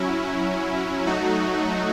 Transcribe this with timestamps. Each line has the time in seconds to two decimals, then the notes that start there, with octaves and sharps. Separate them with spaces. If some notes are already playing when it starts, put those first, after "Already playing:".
Already playing: F#3 C#4 E4
1.06 F#3 A3 D#4 F#4